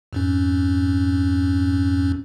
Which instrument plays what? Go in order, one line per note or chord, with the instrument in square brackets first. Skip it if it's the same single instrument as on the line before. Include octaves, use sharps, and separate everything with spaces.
[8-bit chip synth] F2 G#2 C#4